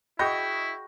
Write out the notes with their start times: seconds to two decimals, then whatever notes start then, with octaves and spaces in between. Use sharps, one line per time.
0.19 E4 F#4 G#4 D#5 G5 B5 G6 A#6